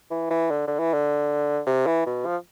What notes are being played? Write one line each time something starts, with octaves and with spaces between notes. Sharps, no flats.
E3
E3
D3
D3
E3
D3
C3
E3
B2
F3